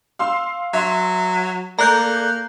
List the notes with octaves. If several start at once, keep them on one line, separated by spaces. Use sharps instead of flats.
F5 C6 E6
F#3 E5 C6
A3 A#3 A4 D5 A#5 F#6 G6